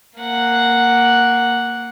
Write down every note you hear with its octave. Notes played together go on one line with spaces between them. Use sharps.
A#3 F#5